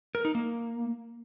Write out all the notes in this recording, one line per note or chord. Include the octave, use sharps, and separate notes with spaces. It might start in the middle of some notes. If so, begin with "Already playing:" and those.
A#4
D#4
A#3